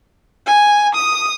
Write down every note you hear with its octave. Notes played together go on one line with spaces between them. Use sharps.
G#5
D#6